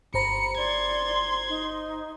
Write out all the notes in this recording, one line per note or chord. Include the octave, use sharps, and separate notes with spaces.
G1 C5 A#5 B5 C#7
D5 C6 G#6
D#4